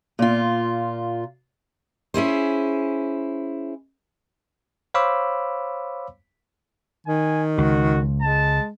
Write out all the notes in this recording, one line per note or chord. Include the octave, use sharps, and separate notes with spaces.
A#2 F4
C#4 E4 G#4 C5
C5 C#5 F5 B5 D6 E6
D#3 G#5
C#2 F#4
G#3 A5